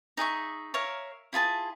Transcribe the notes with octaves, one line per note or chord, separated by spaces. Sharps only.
D#4 G#4 E5 C#6
A#4 C#5 E5 F5
E4 F4 G#4 A5